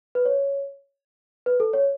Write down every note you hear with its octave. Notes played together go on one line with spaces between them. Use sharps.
B4
C#5
B4
A4
C#5